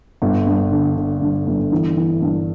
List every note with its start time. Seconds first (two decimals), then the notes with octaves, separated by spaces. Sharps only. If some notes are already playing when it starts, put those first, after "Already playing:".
0.22 G1
0.47 G2
0.72 D3
0.97 D3
1.22 G2
1.47 G1
1.72 E3
1.97 E3
2.22 G2